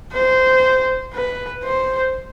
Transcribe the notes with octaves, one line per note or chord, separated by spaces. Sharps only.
C5
B4
C5